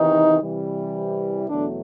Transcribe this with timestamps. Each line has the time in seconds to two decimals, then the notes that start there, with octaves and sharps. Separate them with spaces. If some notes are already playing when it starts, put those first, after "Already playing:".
Already playing: E2 C3 D#3 E3 D#4
0.42 C3 E3 G3
1.49 E2 B2 D3 F#3 A3 D4